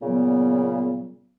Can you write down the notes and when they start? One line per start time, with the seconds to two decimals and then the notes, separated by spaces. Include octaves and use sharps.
0.02 A#2 C#3 F#3 G3 B3